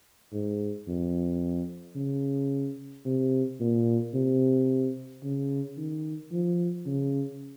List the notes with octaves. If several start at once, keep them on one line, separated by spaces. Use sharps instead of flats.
G#2
F2
C#3
C3
A#2
C3
C#3
D#3
F3
C#3